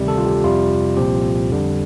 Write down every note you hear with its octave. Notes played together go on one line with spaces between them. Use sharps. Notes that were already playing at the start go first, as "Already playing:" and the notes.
Already playing: D2 C3 D#3 G3
A4
F4
G4
F2 C3 G3 F4
C2 A#2 F3 C4 G4
F2 D3 G3